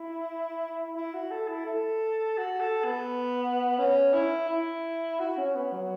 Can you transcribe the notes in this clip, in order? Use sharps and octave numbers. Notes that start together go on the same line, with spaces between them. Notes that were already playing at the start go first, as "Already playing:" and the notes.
Already playing: E4
E4
F#4
A4
E4
A4
F#4
A4
B3
C#4
E4
E4
F#4
C#4
B3
F#3